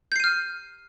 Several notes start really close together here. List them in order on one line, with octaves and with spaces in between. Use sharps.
G6 C7 D#7 F6